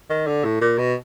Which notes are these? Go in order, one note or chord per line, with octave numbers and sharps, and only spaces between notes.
D#3
D3
A2
A#2
B2